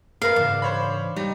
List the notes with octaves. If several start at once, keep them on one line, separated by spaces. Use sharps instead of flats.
F#2 B3 A#4 B4 F5
G#2 C#3 E3 D4
C5 C#5 B5
G3 D#4